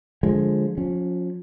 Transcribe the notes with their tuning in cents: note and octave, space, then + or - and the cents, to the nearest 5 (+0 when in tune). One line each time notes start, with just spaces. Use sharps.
D3 +0 F3 +15 G#3 +0
F3 +30 C#4 +0